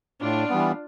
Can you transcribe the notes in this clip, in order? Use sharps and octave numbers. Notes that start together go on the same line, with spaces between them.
A2 D4 F4
E3 G3 B3